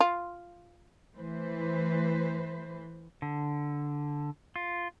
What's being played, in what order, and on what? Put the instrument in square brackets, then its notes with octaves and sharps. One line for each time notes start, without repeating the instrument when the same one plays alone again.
[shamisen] F4
[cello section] E3 A3 B4 C5
[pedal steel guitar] D3
F4